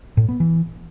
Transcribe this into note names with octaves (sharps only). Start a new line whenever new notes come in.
A2
B3
E3